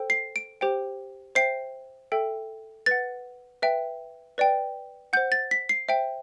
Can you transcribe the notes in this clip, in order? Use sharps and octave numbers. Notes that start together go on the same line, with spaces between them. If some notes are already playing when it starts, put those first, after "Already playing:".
Already playing: A4 C5 G5
C7
D7
G4 C5 G5
C5 E5 G5 C7
A4 E5 G5
B4 F#5 A6
B4 E5 G5
B4 D5 G5
C5 F#5 G6
A6
B6
C7
C5 E5 G5